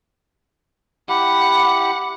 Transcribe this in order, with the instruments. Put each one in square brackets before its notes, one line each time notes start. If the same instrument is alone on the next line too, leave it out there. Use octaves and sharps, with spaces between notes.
[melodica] E4 G4 [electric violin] F#5